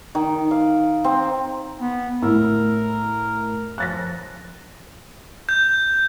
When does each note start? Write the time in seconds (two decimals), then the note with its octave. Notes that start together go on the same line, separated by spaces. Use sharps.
0.15 D#3
0.51 F5
1.04 C4
1.81 B3
2.22 A2 E4 A#4 E6
3.78 F3 F#6 A6 A#6
5.49 G6